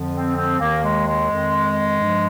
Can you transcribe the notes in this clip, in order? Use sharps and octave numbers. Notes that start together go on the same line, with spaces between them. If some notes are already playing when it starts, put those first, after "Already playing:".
Already playing: F2 D3 F3
C4
C4
D#2 D#3 A#3
G#3
G#3
F2 D#3
G2 F3